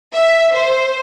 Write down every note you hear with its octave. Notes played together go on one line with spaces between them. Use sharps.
E5
C5